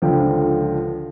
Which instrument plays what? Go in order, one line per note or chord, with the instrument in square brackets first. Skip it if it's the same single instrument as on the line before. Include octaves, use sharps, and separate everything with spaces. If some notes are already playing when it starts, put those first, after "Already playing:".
[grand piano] C#2 D3 F3 D4 G5